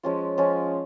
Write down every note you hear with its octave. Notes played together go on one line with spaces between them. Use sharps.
F3 G#3 C#4 F4
F3 G#3 C#4 F4